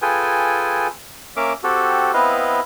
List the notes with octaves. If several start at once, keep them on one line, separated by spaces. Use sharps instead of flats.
F4 G#4 A4 B4 G5 G#5
A#3 C#4 A#4 E5 F5 D6
C4 F#4 G4 A4
B3 C4 E4 B4 D#5 F5